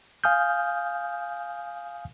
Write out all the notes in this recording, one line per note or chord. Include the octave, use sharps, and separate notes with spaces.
F5 G#5 D#6 F6 G6